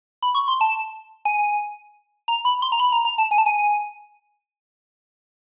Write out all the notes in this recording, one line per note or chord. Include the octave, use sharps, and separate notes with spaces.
B5
C#6
C6
A5
G#5
A#5
B5
C6
A#5
B5
A#5
A#5
A5
G#5
A5
G#5